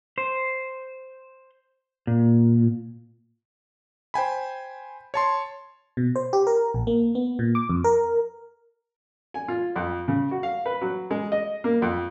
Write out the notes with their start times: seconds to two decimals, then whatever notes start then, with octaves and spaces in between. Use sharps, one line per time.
0.18 C5
2.07 A#2
4.14 C5 G5 G#5 B5
5.14 C#5 A5 C6
5.97 B2
6.16 C5
6.33 G4
6.47 A#4
6.74 A#1
6.87 A#3
7.15 B3
7.39 A#2
7.55 D6
7.69 F2
7.84 A#4
9.34 G#5
9.48 F4
9.76 F2
10.08 C#3
10.31 F#4
10.43 F5
10.66 B4
10.81 F#3
11.11 G#3
11.32 D#5
11.64 A#3
11.82 F2